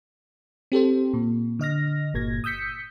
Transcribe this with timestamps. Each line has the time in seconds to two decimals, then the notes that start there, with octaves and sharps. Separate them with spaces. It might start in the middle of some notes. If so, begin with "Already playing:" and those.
0.72 C4 G4 A4 C5
1.14 A#2
1.59 D3 D#5 F6 A#6
2.14 G1 A#2 G#6 A#6
2.44 D#6 E6 G6 B6 C#7